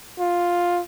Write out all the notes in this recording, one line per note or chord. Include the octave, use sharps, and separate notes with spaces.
F4